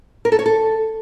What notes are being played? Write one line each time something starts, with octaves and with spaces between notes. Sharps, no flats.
A#4
A4
C#5
A4